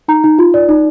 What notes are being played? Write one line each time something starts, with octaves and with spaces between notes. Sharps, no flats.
D#4 A#5
D#4
F4
D5
D#4